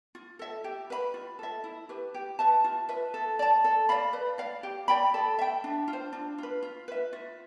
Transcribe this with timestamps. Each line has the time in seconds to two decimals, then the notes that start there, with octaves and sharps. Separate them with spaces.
0.15 F4
0.39 A4 E5
0.64 G4
0.90 B4 E5 B5
1.14 F4
1.39 A4 E5
1.64 E4
1.89 G4 B4
2.14 G4
2.39 B4 E5 A5
2.64 F4
2.89 B4 E5
3.14 A4
3.39 D5 A5
3.64 A4
3.89 D5 F5 B5
4.13 B4
4.38 D5 F5
4.63 G4
4.88 D5 G5 B5
5.14 A4
5.39 E5 G5
5.64 D4
5.88 F4
5.93 C5
6.13 D4
6.38 F4 B4
6.63 F4
6.88 B4 E5
7.13 F4